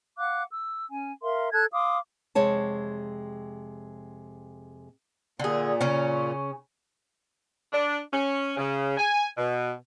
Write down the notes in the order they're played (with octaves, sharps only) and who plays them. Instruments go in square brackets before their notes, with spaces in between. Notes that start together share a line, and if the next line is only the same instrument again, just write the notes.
[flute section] F5 F#5 D6 F#6
E6
C#4 G#5
A#4 E5 F5 C6
A4 A5 F#6 G#6
F5 C6 D6 D#6
[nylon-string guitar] F2 C3 G#3 C#5 A5
[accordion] A#2 [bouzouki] D3 G#4
[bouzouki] C#3 C#4
[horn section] D4
C#4
C#3
G#5
B2